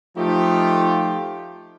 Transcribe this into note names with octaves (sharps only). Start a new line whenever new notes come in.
F3 A3 D#4 F4 G4